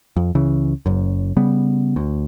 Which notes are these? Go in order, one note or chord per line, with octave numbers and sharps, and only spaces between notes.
F2
C#2 C#3 E3
F#1 F#2
C#3 G3 B3
D2